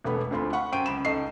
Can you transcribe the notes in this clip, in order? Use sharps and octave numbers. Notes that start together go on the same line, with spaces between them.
E1 A3 B3 B5
D2 A3 C4 F4 B5
F5 F#5 B5 C#6
F#2 C5 G5 C#6 D7 D#7
C#2 B5 E7
C#2 D#4 A4 D#5 C#6 C7